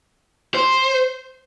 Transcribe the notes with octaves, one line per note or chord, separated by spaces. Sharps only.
C5